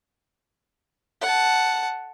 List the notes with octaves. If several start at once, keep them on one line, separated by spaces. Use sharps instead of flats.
F#5 A5